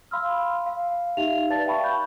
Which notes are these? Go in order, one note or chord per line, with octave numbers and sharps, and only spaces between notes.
F5 B5 C6 E6 F6
F5
D#4 G4 E5 F5 F7
B4 D5 A5 A6
E5 F5 G5 A5 B5 C#6
C#6 F#6 G6